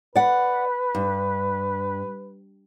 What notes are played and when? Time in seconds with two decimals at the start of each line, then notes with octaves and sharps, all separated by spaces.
0.16 B4 D5 F#5
0.95 G2